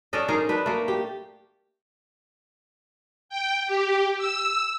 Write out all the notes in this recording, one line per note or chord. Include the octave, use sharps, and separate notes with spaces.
C#4 D4 A4 D#5
D#4 G#4 A#4 C5
D4 B4
A3 A#3
G4
G5
G4
E6